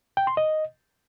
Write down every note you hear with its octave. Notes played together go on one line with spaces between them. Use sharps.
G5
C6
D#5